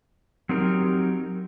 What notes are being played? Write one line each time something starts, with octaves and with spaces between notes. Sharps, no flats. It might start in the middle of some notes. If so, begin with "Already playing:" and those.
F#3 C4 D#4 G4 A#4